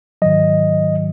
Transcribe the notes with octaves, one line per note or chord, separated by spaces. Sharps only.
G#2 D#3 F#3 D#5